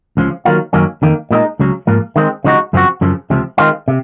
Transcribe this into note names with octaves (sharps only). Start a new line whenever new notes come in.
C#2 C#3 F3
D#3 F#3 A#3 F4
F#2 D#3 F#3 A#3 C#4
F2 D#3 A#3
A#2 G#3 C4 D#4
C#2 C#3 F#3
G#2 F3 A#3
D#3 G#3 C4
C#3 F3 G#3 D#4 F#4
F#2 C#3 F3 C4 F#4
F#2 C#3 F3
C#2 C3 F3
D#3 G#3 C4 F4
C3